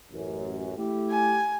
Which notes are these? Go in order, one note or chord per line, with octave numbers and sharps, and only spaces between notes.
A1 F#2
A3 E4 G4
G#5